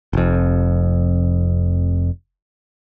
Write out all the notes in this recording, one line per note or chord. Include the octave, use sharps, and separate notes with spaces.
F1 F2